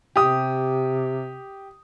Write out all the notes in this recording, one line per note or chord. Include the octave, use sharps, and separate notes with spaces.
C3 G4 D#6